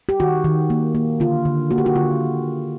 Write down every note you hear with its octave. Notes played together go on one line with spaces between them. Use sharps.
G4
D#3 F#4
D#3
A#3
A#3
D3 F4
D3
A#3 F#4
G4
F#4
D3 F4